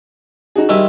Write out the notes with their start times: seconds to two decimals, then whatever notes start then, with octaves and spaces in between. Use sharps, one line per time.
0.55 D#4 F#4 G#4
0.69 D#3 G3 G#3 E4